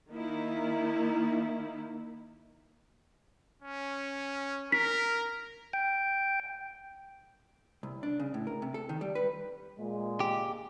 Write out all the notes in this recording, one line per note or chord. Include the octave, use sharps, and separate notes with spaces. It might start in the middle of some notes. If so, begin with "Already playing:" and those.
D#3 A#3 D#4 E4
C#4
A#4 B6
G5
C2
D4
C#3
A2
A#4
C3
A4
D#3
G3
B4
A#2 G#3
G4